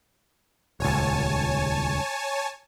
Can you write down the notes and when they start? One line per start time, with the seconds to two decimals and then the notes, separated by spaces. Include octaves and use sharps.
0.80 D#1 C#2 C#5 G#5 A5